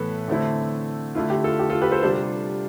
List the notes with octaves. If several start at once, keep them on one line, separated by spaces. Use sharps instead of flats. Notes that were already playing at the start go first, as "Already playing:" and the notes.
Already playing: A2 E3 B3 A4 B4
D3 A3 C4 E4
D3 A3 E4 F4
G4
F4 A4
G4
F4 A4
G4 B4
A4 C5
C3 G3 D4 F4 A4 C5